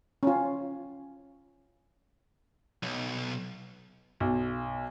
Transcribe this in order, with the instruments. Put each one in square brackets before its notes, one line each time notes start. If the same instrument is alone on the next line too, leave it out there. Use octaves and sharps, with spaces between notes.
[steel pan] C#4 F4
[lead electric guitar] B1
[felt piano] B1